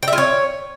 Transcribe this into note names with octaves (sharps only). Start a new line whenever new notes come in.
G5
E5
F4
C#5